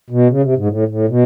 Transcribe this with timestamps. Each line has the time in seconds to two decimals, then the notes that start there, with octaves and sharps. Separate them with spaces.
0.10 B2
0.30 C#3
0.43 C3
0.57 G#2
0.65 A#2
0.70 A2
0.88 A2
1.09 B2